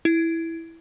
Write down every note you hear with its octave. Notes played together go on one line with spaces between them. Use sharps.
E4